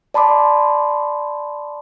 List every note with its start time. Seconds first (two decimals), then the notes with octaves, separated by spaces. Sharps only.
0.14 D5 A5 B5 C6 D6